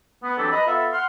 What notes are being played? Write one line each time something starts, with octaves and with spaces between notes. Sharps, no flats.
B3
E3 F#3 C4 D4 G4 A4
B4 D#5 A#5 B5
B3 F4 A4 E5
F#5 C6 F6